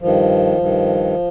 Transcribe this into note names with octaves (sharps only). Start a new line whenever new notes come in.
G2 D#3 F3
G2 D#3